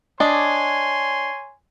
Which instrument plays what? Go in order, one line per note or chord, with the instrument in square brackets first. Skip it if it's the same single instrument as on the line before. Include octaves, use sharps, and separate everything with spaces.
[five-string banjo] D4 D#5 [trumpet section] C#5 G#5 C6